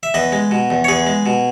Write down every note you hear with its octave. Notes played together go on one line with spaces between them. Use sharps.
E5
E2 B4 D#5
G#3
B2
E2
C#5
E2 G#4 B4
G#3
B2